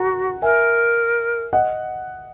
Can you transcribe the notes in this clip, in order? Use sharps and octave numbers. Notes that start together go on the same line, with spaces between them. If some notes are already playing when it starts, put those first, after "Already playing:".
Already playing: F#4 F#5 A#5
A#4 E5 G#5
D#5 F#5